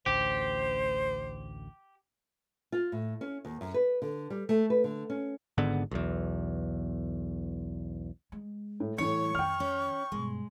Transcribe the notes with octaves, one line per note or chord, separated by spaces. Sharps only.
A1 D2 G4 C5
F4
A2
C#4
D#2
F#2
B4
D3
G3
A3
B4
D3
C#4
G#1 G#2 D3 B3
B1 E2
G#3
A2
A2 E3 G3 C#5 C#6 C#7
F2 D#3 G5 F6
C#4
G2 B2 G#3